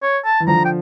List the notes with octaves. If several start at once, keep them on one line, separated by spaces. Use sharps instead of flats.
C#5
A5
E3
D3 F3 A#5
G5